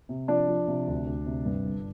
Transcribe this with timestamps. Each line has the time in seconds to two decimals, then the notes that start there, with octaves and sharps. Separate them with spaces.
0.09 C3
0.28 F3 D4 D5
0.48 F3
0.67 C3
0.87 D2
1.06 D2
1.26 C3
1.45 G2
1.65 G1